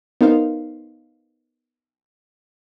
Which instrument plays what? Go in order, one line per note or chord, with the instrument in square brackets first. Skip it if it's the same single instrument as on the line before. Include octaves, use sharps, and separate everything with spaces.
[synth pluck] B3 D#4 A#4 C5 F5